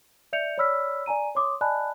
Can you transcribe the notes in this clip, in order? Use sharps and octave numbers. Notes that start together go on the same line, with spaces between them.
D5 E5 G6 C#7 F7
C#5 D5 B5 E6 F6 B6
D5 G#5 A#5 D#7
C#5 C6 D6 D#6
D5 D#5 G#5 A5 B5 F#6